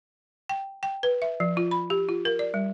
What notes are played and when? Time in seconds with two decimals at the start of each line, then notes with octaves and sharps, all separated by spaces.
0.49 G5
0.83 G5
1.03 B4
1.22 E5
1.40 F3
1.57 F4
1.71 B5
1.90 G4
2.09 F4
2.25 A#4
2.39 D5
2.54 G3